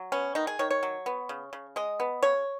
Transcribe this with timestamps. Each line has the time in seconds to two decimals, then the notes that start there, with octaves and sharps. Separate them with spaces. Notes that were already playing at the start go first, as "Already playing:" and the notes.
Already playing: F#3
0.12 B3 C#4
0.35 D#3 D#4
0.47 G#4
0.59 D#3 C#5
0.71 C#5
0.83 F#3
1.06 B3
1.29 C#3
1.53 C#3
1.76 G#3 D#5
2.00 B3
2.23 C#3 C#5